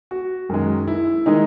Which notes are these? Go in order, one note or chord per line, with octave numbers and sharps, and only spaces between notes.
F#4
F#2 D#3 G#3
E4
D#3 G#3 D#4